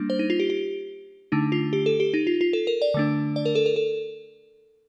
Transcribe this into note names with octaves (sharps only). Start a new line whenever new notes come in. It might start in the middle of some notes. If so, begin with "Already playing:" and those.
Already playing: G3 A#3 D4
C5
D#4
F4
G4
G4
D3 A3 D4 D#4
F4
G4
A4
G4
D#4
F4
F4
A4
A#4
D5
D3 A3 D4
D5
A#4
A4
A#4
A4